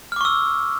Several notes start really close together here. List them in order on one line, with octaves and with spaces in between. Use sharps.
F6 D6 C#6 E6